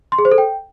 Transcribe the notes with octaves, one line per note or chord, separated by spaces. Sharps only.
C6
G#4
C5
A4
G5